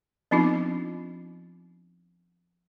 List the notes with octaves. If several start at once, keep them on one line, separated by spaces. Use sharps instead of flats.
F3 B3 C4 D4 D#4 F4